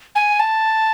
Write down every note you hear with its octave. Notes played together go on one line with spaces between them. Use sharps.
G#5
A5